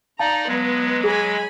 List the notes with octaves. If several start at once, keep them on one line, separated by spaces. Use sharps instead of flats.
D#4 D5 F5 A5 A#5
F#3 G#3 B3 B4
G#4 G#5 B5